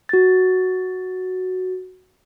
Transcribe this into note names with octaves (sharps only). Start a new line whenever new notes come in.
F#4 A6